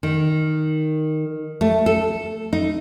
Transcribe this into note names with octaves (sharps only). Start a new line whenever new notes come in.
D#3
A3
A4
D#4